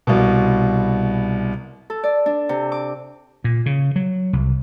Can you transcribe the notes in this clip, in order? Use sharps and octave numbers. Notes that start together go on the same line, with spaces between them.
C2 B2
A4
D5
D4
C3
D6
A#2
C#3
F#3
C2